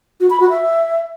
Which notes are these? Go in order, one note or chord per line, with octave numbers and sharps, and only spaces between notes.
F#4
B5
F#4
E5